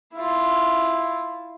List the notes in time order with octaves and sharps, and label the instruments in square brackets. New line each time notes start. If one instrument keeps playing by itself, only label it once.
[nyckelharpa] E4 F4